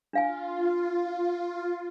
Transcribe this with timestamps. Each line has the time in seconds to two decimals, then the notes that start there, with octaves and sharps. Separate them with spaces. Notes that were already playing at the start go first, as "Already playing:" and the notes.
0.13 D4 F4 F5 G#5